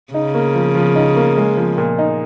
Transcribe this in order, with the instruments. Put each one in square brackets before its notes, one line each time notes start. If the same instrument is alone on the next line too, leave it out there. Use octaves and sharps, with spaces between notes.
[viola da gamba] C#3 [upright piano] D#4
[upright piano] A#3
F3
F3
D#4
A#3
G#3
F3
A#2
D#4